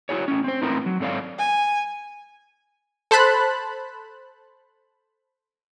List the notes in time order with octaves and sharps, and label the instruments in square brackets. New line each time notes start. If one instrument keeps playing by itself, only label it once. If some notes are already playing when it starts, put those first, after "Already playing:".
[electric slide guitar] E4 F#4 G#4 C#5
A2 C#4
C4 C5
A2 C4 D#4 E4 A#4 B4
F#3
G#2 C4 A4 C#5 D5 F5
[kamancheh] G#5
[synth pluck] A4 C5 A5 B5 F#6